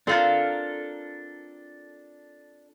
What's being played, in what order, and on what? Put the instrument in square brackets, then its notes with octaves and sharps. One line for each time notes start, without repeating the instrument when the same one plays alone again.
[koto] C4 F4 A#4 [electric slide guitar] D4 A4